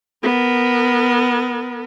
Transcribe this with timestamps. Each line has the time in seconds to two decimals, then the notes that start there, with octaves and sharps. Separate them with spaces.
0.23 B3 A#4